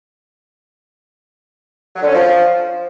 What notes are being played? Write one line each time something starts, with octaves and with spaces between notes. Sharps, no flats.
F#3
D3
C#4
F3